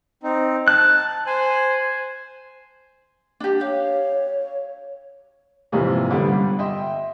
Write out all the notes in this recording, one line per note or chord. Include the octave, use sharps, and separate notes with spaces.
C4 D#4
A5 F#6
C5 G#5
D4 G4
C#5 F5
F2 G#2 C3 E3 A#3
D3 G3 B3
G2
D#5 E5 G5 C6